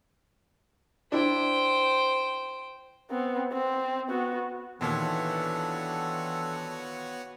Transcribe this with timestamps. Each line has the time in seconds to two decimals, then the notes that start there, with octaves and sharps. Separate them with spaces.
1.12 D4 E4 C5 G5
3.10 B3 C4
3.52 C4
4.09 B3 F#4
4.81 D#2 A#2 E3 B3 D4 F#4 A4 C#5